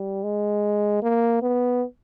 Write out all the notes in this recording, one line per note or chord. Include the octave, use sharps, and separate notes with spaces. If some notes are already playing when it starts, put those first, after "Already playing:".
Already playing: G3
G#3
A#3
B3